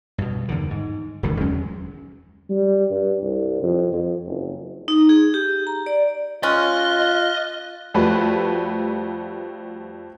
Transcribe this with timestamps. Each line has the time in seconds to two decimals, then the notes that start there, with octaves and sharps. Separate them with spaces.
0.18 G2 B2
0.48 E2 D3 D#3
0.70 G#2
1.23 E1 C#2 D3 D#3
1.41 E2 F#3 G#3 C#4
2.50 G3
2.91 G2
3.23 C2
3.63 F2
3.92 F2
4.27 F#1
4.88 D#4
5.09 G#4
5.34 G4
5.67 A#5
5.86 D5
6.43 G#3 C#4 F4 D#5 F6 F#6 A6
7.94 F2 G3 A3 F#4 B4